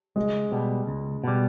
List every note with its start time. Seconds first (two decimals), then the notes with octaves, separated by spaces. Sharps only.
0.16 C#2 G#3
0.52 B2 G3
0.87 C#2
1.24 B2 G3